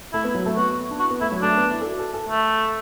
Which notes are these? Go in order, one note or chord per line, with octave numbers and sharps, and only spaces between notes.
A3 E4
B3
F#3
A3
B3 F#4
D4
E4 F#4
B3
A3 E4
F#3
A3 D4
B3
E4
A4
F#4
A4
A4
A3